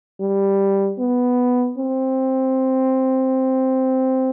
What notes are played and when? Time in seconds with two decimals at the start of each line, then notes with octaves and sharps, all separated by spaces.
0.20 G3
0.99 B3
1.78 C4